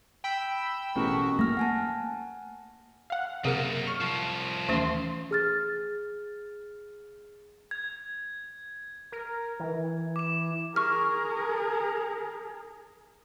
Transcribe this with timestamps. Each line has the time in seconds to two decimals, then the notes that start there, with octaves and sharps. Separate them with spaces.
0.24 G5 B5 E6
0.95 A1 B2 F#4 G#4 A#4
1.39 A3 A#3 F6 A#6
1.57 F#5 G#5 A5
3.10 F5 F#5
3.45 F#2 C3 A#3 G#4 A#4 F#5
3.87 C#6 F6
4.01 C2 F3
4.69 D#2 E3 A3 C#4 C6
5.31 G#4 F6 A6
7.71 G#6
9.12 A#4
9.60 E3
10.16 D6 E7
10.76 G#4 A#4 C#6 F6